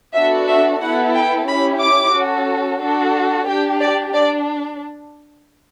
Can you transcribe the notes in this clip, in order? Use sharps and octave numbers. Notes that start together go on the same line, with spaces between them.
B3 D4 F#4 A4 E5
E5
B3 E4 A4 F#5
G5
C#4 E4 G4 B5
D6
C#4 F#4 A4
D4 F#4 A4
D4 G4 G5
D5
D4 D5